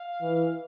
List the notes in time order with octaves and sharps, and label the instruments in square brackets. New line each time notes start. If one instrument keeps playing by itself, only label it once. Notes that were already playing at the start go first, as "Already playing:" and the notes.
Already playing: [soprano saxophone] F5
[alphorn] E3